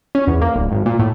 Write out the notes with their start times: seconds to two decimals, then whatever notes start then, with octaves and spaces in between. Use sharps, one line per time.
0.15 C#4
0.27 E2
0.41 A#3
0.56 D1
0.71 G#1
0.86 A#2
0.99 A2